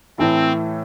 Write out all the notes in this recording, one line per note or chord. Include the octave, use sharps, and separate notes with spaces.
A2 E3 A3 C4 E4